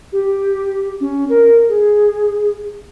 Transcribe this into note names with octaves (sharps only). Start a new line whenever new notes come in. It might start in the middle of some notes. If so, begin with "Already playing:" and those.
G4
C#4
A#4
G#4